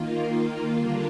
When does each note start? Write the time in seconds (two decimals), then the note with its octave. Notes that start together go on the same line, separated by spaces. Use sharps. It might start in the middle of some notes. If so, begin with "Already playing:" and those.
Already playing: D#3 A#3 F4
0.75 D3 G3 A#3 D4 F4